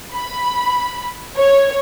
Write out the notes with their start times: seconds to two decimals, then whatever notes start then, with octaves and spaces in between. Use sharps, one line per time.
0.15 B5
1.38 C#5